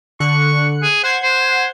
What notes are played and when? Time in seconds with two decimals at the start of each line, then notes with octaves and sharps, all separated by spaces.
0.20 D3 C#6 F#6 C#7
0.82 G#4
1.04 C5 F#5 G#6 C7
1.23 C5